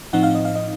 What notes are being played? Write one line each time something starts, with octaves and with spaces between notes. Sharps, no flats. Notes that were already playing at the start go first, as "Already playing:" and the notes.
A2 F3 C4 D#4 F#5
F5
D#5
F5
D#5